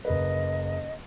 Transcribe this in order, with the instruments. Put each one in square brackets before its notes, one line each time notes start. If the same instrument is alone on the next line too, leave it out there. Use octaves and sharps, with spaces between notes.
[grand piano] F#1 A#4 B4 [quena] D#5